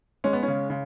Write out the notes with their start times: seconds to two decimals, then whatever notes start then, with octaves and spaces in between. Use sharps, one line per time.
0.24 G#3 C#4
0.33 B3
0.43 C#3 C#4
0.70 C#3